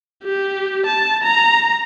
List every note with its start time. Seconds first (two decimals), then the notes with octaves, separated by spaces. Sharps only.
0.23 G4
0.86 A5
1.23 A#5